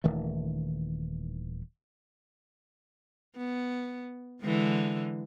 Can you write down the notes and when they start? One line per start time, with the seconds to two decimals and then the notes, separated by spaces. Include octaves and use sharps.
0.04 D#1 D#3 E3 A3
3.36 B3
4.42 D3 E3 G#3